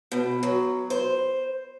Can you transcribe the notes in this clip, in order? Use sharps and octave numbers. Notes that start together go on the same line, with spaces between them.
B2
F#3
C5